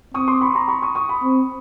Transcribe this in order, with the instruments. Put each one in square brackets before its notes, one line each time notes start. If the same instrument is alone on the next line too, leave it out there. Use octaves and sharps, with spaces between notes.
[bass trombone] C4 [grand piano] C#6 D#6
[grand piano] C6 D6
B5 C#6
A#5 C6
B5 C#6
C#6 D#6
C#6 D#6
B5 C#6
[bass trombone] C4